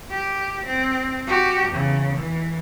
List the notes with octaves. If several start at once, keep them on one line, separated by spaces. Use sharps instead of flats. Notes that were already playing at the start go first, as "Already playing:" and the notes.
G4
C4
F#4 G4
E2 C#3
E3